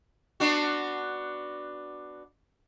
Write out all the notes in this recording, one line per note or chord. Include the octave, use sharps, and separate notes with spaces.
B3 D4 F#4